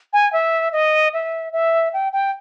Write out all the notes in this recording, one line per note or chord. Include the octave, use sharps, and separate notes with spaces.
G#5
E5
D#5
E5
E5
G5
G5